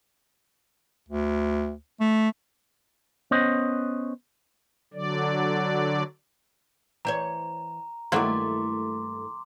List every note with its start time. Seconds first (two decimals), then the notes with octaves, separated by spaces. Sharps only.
1.08 D2
2.00 A3
3.31 B3 C#4 C5 D#5
4.94 D3 F#3 D5
7.05 E3 C5 C#5 A#5
8.12 G2 D#3 F#3 A3 A#3 E4 C6 D6